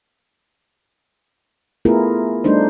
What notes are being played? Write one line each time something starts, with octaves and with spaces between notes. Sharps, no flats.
A3 B3 E4 F4 G#4 A#4
G3 A3 D4 D#4 C5